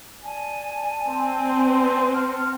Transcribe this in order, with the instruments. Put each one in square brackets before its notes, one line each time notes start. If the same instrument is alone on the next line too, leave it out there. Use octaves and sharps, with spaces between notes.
[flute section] D5 G#5 A5
[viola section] C4
[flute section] F#5 A5 F6